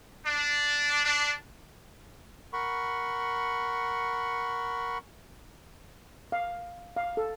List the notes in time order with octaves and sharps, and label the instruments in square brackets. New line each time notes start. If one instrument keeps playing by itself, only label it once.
[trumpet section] D4
D4
[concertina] A#4 F#5 B5 C#6
[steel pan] F5
F5
A4